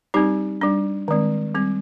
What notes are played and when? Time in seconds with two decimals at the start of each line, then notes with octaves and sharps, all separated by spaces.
0.14 G3 C4 D#4 G4
0.61 G3 D4
1.08 D#3 G#3 C4
1.55 G3 C4